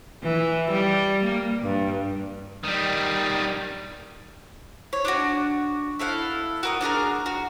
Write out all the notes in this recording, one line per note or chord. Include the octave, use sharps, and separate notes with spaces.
E3
G3
A#3
G2
D#3 G3
C#5
D4 F4 F#4
E4 A4 F5 F#5
F#4 A#4 D#6
D4 F#4 G#4 A#4
F#4